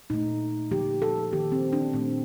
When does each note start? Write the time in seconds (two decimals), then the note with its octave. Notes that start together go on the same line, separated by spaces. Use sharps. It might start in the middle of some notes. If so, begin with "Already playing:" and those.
0.10 A#2 A3 D#4
0.71 D3 F3 A#3 G4
1.02 A4
1.32 D#3 A#3 G4
1.52 C4
1.73 D4
1.93 A#2 A3 C4